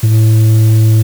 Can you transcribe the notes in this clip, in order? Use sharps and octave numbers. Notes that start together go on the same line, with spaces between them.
A2